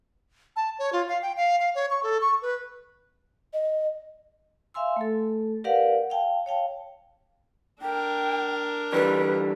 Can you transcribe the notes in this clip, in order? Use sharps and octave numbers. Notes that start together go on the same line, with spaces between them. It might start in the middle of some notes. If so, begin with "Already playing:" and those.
A5
C#5
F4
F5
G5
F5
F5
C#5
C#6
A4
C#6
B4
D#5
E5 F5 G#5 C6 E6
A3 A4
G4 A#4 B4 D5 F5 F#5
F5 G5 A5
C#5 F5 G5 A5
D4 A#4 G5
D3 E3 G3 B4